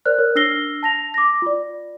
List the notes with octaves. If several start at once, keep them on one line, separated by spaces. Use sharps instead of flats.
A#4 C5 D5 F6 F#6
A#4 C#5
D4 E6 F6 A#6 C7 G7
A5 A#6 F7
D6 A#6
F4 D5